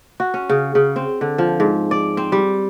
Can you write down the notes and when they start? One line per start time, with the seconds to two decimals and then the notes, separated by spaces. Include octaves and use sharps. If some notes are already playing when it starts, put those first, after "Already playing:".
0.20 F#4
0.34 C#4
0.49 C#3
0.75 C#3
0.96 C4
1.21 D3
1.38 F3
1.60 G#2
1.91 D5
2.17 C4
2.32 G3